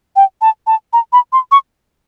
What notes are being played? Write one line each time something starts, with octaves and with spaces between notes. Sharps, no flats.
G5
A5
A5
A#5
B5
C6
C#6